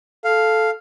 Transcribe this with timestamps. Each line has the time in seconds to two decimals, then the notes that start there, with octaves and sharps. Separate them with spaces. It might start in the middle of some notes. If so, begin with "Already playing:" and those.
0.25 A4 F5